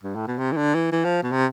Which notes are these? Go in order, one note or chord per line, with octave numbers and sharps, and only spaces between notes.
G2
A2
B2
C3
E3
D3
E3
E3
F3
B2
C3